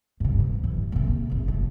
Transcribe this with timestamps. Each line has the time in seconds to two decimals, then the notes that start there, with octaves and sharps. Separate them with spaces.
0.20 G2 C3
0.40 G2
0.64 G2 E3
0.92 A#1 C3
1.30 F1 A#1
1.48 B1